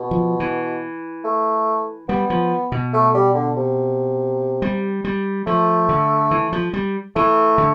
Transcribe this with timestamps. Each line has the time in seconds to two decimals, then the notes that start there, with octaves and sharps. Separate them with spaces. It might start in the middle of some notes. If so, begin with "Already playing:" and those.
Already playing: B2
0.11 F3
0.40 E3
1.24 A3
2.09 G3 B3
2.30 F3
2.72 B2
2.93 A3
3.14 G3
3.35 D3
3.57 C3
4.62 G3
5.04 G3
5.46 F3 A3
5.89 D3
6.31 E3
6.53 F3
6.74 G3
7.16 E3 A3
7.58 D3